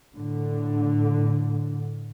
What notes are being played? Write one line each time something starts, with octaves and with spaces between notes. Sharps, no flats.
A2 D3